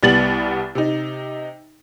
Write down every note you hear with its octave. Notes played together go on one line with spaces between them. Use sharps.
C2 G3 B3 A6 F#7
C3 D#4